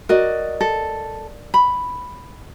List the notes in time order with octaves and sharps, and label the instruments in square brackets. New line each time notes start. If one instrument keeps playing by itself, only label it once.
[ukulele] F#4 [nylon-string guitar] A#4 D5 D#5
[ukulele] A4
B5